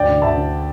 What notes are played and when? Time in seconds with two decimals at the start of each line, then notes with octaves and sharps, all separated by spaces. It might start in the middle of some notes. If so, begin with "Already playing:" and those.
Already playing: D2 D5 G5
0.09 D3
0.22 D2 E5 A5
0.37 D3